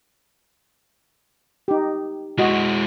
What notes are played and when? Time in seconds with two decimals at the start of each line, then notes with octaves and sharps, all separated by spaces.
1.68 D#4 G4
2.39 G#3 E4 F#4 D#5